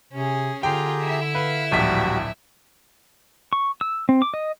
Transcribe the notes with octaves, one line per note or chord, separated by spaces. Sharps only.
C3 C#4 G#4
D3 F4 G4 G#4 G5 A#5
E4 E5
B4 F5 B5
D1 A#1 G3 F#4 B6
C#6
E6
C4
D6
D#5